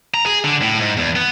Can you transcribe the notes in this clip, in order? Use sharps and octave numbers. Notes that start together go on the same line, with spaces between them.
A#5
G#4
D3
A2
G#2
E2
B3